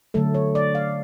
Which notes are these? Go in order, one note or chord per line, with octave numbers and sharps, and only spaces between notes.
D3 F#3 A3 A4
C#5
D5
F5